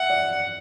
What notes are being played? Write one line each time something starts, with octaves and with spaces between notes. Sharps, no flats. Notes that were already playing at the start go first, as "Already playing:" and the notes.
Already playing: E5 F#5
D5